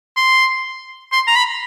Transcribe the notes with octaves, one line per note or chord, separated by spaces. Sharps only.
C6
C6
A#5
B5